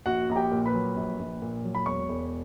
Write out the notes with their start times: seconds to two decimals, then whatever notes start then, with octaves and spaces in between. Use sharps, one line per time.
0.06 A#1 F#4 F#5
0.29 A#1 A#5
0.36 G4 G5
0.52 A#2
0.66 B4 B5
0.73 F#3
0.96 A#1
1.19 A#1
1.42 A#2
1.64 F#3
1.75 B5
1.86 E1 C#5 C#6
2.09 E1